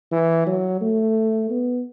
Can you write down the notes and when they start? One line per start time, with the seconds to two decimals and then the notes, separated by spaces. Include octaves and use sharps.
0.12 E3
0.47 F#3
0.81 A3
1.50 B3